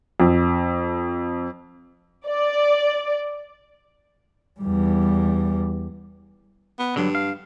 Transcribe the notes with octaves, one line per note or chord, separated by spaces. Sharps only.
F2
D5
E2 G3
B3
G2 D3 F#3
F5